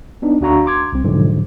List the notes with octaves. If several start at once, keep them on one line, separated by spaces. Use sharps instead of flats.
B3 D4 D#4
D2 D4 F#4 F5 A#5 C#6
C6 D6 G#6
C2 C4
G#2 B2 D3 F3 F#3